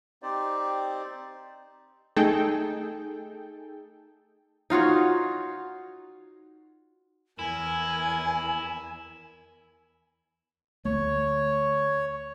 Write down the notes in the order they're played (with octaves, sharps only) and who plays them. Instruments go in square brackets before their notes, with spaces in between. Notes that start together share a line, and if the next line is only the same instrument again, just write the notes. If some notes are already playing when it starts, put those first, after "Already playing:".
[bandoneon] C4 D#4 G4 C5 D5
[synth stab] A3 D#4 G#4 A4 G5
[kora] D#4 F4 F#4 C#5
[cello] E2 [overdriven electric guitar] E4 [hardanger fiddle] A#4 [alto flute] G#5
[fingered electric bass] D2 A3 [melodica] C#5